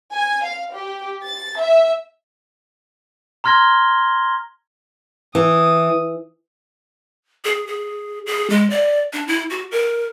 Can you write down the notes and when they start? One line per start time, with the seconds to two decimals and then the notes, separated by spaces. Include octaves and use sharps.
0.12 G#5
0.44 F5
0.74 G4
1.25 A6
1.61 E5
3.44 A#5 C6 F6 G#6 A#6 G7
5.35 E3 D#6
7.45 G#4
7.67 G#4
8.26 G#4
8.50 G#3
8.70 D5
9.13 D4
9.27 E4
9.50 F#4
9.71 A#4